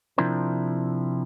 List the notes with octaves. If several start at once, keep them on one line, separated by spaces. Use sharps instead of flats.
C3 F3 D4 E4 A#4 C5